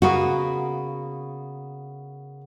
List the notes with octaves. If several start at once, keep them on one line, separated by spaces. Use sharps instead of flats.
C#3 A#3 B3 F#4